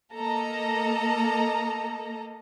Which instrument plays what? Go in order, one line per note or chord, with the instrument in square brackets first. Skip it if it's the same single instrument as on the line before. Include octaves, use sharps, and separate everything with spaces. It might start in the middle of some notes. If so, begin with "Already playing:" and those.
[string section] A#3 A4 D#5 A#5